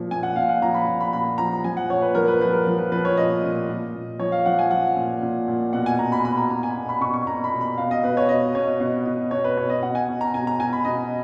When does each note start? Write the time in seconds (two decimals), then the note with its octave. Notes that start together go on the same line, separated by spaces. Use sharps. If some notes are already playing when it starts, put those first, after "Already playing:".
Already playing: A#2 F3
0.11 A#2 G#5
0.23 F#5
0.36 A#2 F5
0.49 F#5
0.62 F3 A#5
0.74 B5
0.87 A#2
1.01 B5
1.13 A#2 B5
1.38 F3 A#5
1.64 F3 G#5
1.77 F#5
1.89 A#2 C#5
2.02 B4
2.15 F3 A#4
2.28 B4
2.41 F3 B4
2.53 A#4
2.67 F3
2.79 B4
2.92 F3 B4
3.05 C#5
3.17 A#2 D#5
3.43 A#2
3.69 A#2
3.95 A#2
4.19 F3 C#5
4.32 F5
4.46 F3 F#5
4.59 G#5
4.71 F3 F#5
4.96 A#2
5.22 A#2
5.48 A#2
5.73 B2 F#5
5.86 G#5
5.98 B2 A#5
6.12 B5
6.24 B2 B5
6.38 A#5
6.50 B2 A#5
6.63 G#5
6.76 B2
6.89 B5
7.01 B2 C#6
7.14 C#6
7.26 B2 A#5
7.44 B5
7.53 B2
7.61 B5
7.77 B2 F5
7.91 D#5
8.04 B2 B4
8.17 C#5
8.29 B2 D#5
8.55 B2 C#5
8.80 B2
9.06 B2
9.31 B2 C#5
9.44 B4
9.57 B2 C#5
9.70 D#5
9.82 B2 F#5
9.95 G#5
10.09 B2
10.21 A#5
10.34 B2 G#5
10.47 A#5
10.59 B2 G#5
10.73 B5
10.85 B2 D#5